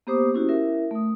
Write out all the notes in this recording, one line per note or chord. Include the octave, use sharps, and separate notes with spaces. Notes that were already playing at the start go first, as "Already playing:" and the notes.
A#3 B3 G4 C5 D6 D#6
C#4 E4 F#4 G4
E4 A#4 E5
A3 D#6